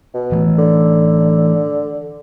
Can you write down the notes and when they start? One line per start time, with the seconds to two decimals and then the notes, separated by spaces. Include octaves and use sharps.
0.14 B2
0.32 E3 A3
0.58 D3